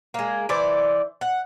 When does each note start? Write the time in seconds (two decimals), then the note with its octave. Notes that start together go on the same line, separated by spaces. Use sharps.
0.14 G#3 A#3
0.49 E3 C5 D5
1.21 F#5